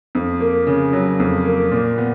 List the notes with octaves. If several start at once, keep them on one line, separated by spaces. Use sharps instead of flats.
F2
A#3
C#3
F#3
F2
A#3
A#2
B3